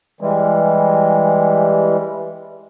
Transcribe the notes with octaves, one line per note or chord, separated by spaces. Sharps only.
E3 G3 G#3